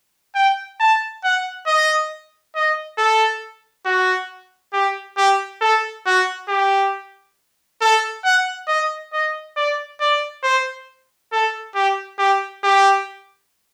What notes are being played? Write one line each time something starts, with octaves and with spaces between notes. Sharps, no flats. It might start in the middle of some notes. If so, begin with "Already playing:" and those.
G5
A5
F#5
D#5
D#5
A4
F#4
G4
G4
A4
F#4
G4
A4
F#5
D#5
D#5
D5
D5
C5
A4
G4
G4
G4